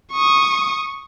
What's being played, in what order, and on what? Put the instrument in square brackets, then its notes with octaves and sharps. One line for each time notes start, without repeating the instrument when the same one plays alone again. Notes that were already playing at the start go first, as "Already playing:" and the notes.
[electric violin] C#6 D#6